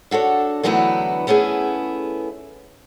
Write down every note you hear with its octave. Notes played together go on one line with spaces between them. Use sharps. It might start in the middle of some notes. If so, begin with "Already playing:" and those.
D4 F#4 A4 C#5
D3 E3 F#3 A3 B3 E4
A3 B3 C#4 E4 G#4